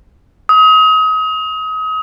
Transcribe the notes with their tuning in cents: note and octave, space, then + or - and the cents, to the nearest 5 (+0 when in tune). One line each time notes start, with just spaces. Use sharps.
D#6 +30